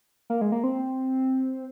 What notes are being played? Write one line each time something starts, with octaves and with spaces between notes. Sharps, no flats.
A#3
G#3
A#3
C4